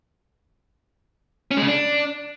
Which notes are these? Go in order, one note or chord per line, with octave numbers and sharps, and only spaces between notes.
C#4
G#3
C#3
D4